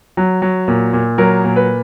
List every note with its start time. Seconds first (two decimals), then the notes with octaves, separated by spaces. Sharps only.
0.17 F#3
0.42 F#3
0.68 A#2
0.93 A#2
1.18 F#3 A#4
1.44 A#2
1.56 B4